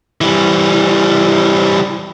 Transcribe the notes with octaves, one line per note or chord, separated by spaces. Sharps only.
E3 G3